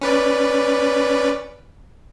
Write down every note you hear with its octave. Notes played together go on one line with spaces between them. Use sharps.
C#4 B4 D5